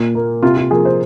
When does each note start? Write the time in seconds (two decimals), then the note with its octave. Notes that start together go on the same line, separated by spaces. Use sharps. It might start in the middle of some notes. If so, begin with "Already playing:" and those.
Already playing: A#2
0.15 A#3
0.43 C3 F4
0.57 F4
0.71 F3 A#3 G#4
0.85 C5